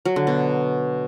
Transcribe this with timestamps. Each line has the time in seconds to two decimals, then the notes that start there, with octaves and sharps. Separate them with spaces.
0.05 F#3
0.16 D3
0.27 B2